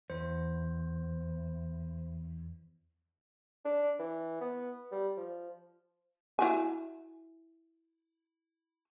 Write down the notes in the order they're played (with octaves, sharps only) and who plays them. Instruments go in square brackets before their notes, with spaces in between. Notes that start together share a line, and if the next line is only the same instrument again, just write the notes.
[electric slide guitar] E2 [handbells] C5
[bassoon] D4
E3
B3
G3
F3
[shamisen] E4 F#4 G#5